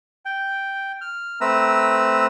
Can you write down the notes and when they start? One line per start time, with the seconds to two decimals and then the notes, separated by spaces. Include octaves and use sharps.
0.25 G5
1.01 F6
1.41 A3 C4 B4 A#5 E6